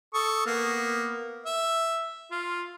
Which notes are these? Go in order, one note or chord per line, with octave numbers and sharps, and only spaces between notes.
A4 C#6 D#6
A#3 B3 F6
E5
F4